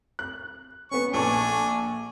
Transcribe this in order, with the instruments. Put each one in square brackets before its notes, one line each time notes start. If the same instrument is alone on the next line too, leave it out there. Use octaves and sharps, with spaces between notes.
[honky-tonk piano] F#6
[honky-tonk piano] B3 C#4 [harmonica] C#6
[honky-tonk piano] A#1 A4 C#6 [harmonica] D4 G#5